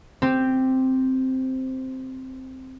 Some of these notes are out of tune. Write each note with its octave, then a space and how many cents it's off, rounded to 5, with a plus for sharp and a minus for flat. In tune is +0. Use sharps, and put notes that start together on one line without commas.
C4 +0 G4 +0